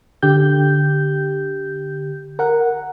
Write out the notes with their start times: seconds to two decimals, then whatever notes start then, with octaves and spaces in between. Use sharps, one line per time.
0.22 D3 G4 G6
2.39 A#4 F#5